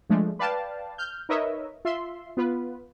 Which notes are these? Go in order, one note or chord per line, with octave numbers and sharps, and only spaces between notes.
F3 G#3 A3 D4
B4 D5 F5 G5 A5
F6 G6
D#4 A#4 B4 C#5 D#5 E5
F4 E5 C6
B3 F4 B4